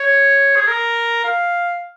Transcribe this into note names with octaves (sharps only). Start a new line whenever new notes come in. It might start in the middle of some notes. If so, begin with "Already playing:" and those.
Already playing: C#5
G#4
A#4
F5